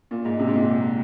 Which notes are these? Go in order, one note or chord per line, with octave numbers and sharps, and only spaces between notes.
A#2
G#2
C3
G#2
A#2